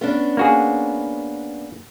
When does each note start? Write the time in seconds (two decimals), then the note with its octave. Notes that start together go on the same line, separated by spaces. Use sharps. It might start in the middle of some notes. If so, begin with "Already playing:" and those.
0.01 B3 C#4 D4
0.37 A#3 F#4 G#4